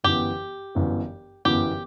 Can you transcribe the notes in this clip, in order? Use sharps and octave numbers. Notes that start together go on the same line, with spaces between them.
G1 F#2 E3 B3 G4
G1 F#2 E3 B3
G1 F#2 E3 B3 G4